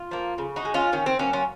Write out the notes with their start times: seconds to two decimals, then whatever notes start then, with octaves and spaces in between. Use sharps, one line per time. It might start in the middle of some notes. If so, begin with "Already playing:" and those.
Already playing: F4
0.11 F3 A#3
0.38 C#3
0.56 D#4 F#4
0.65 G#3
0.74 C#4 F4
0.92 D#3 C#4
1.06 C4
1.19 F#3 A#3 C#4
1.33 C#4 F4